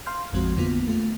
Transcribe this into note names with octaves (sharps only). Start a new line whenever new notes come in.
F5 C6 F6 G6
A1 F2 F3 G#3 C4 F#4
F2 D3 A#3 B3 F4
A3 F4